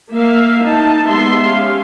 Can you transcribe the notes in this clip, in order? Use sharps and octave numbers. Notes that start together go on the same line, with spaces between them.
A#3 E5 F5
D#4 A5
G#3 B3 G4 E5 C6
C#4 G4 F5